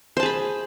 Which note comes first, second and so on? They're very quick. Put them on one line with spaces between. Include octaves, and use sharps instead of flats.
C5 A5 G#4 B5